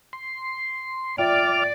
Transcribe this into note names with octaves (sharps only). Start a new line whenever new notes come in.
C6
F4 D5 E5 G5 D6 F6